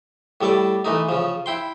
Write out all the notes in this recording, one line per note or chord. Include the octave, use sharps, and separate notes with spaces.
A2 G3 A4 D5 A5
E3 A3 D#4
C#3 F3
E4 G5 C6